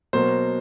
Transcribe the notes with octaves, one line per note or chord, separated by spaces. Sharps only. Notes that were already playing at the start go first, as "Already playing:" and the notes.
B2 F#3 A#3 C5